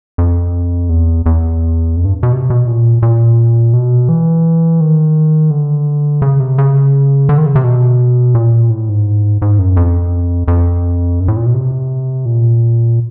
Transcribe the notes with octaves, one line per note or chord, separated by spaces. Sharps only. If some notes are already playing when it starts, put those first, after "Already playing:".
F2
E2
E2
F2
G2
B2
C3
B2
A#2
A#2
B2
E3
D#3
D3
C#3
C3
C#3
D3
D#3
C#3
C3
B2
A#2
A2
G#2
G#2
F#2
F2
F2
F#2
A2
A#2
B2
C3
A#2